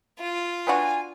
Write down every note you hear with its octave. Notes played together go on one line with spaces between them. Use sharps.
F4
B3 D4 F#4 G#5